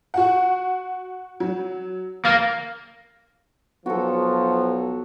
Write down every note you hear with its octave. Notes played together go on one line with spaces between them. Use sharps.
F#4 F#5
F#3
A#3 A6
B1 F3 F#4 A4